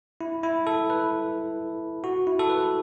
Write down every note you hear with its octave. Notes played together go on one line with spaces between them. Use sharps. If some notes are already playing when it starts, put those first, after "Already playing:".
E4
E4
A4
B4
F#4
E4
A4
B4